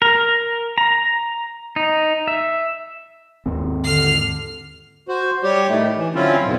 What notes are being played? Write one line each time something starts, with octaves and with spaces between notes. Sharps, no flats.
A#4
A#5
D#4
E5
D#2 G#2 C4
D3 F6 C7
F#4 C5
G3 G4 C#5
A2 D#3 A3
E3
D3 F#3 C4 C#4 E4 F4
F2 G#2 B2